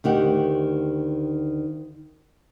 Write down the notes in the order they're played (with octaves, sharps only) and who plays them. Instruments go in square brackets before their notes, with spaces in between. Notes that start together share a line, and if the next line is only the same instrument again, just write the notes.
[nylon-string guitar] D2 D#3 G4 F#5